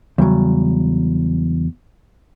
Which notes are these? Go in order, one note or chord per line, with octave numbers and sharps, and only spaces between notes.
E2 C#3 F#3 G3